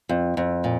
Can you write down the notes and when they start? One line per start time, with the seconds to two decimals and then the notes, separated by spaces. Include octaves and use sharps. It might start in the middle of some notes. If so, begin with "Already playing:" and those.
0.09 F2
0.37 F2
0.64 A#2